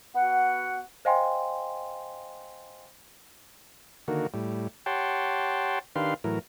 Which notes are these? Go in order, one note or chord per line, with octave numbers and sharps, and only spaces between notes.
B3 F#4 F#5
C5 D#5 F5 G5 G#5 C6
D3 D#3 A#3 F#4
A2 G3
G4 C#5 F#5 G5 A5 C6
D#3 D4 G4 B4 F5 C6
A2 E3 F#3 A#4